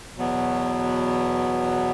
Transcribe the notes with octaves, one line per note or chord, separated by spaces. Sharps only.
E2 B2 F#3 B3